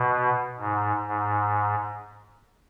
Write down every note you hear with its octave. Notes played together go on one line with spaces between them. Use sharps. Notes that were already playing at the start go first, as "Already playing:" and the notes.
Already playing: B2
G#2
G#2